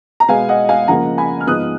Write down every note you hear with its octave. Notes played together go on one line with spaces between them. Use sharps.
A#5
B2 G#3 B3 F5 G#5
D#5 F#5
F5 G#5
C#3 F3 A#3 F#5 A#5
G#5 B5
F6
G#2 F3 B3 D#6 F#6